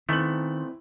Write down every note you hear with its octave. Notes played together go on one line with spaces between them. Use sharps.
A#2 D#3 A3 B3 C4 E4 F#7